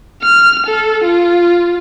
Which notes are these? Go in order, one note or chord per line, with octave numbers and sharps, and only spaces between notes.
F6
A4
F4